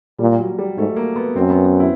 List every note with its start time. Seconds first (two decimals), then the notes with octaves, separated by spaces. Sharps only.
0.19 A#2 G3
0.39 F#3
0.59 G3
0.77 G#2 A3
0.96 A#3
1.16 B3
1.36 F#2 C4
1.50 B3
1.65 B3
1.80 E4